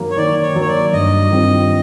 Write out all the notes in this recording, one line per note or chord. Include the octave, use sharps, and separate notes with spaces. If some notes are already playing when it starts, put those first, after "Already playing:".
Already playing: D#3 F#3 A#3
C#5
D#3 D5
C#5
F#3 A#3
C#5
D5
G2 D#5
D#3 G3 C4 F4